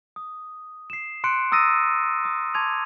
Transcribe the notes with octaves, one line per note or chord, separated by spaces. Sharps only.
D#6
C7 E7
C6 F#6 C#7 D7
A#5 D#6 E6 A6 A#6 D#7
D#6 E6
A5 C6 D6 G#6 D#7 F7